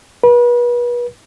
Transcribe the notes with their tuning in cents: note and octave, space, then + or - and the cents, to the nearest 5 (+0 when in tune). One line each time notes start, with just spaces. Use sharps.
B4 -35